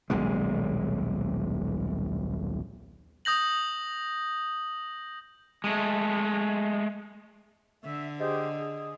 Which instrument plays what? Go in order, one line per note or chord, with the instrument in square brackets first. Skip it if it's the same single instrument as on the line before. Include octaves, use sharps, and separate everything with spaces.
[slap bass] D#1 B1 C3 G#3
[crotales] D#6 G6 A#6 F#7
[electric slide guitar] G#3 A3
[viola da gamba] D3 [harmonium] E5
[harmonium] G4 G#4 C5 [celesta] D#5
[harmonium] G#4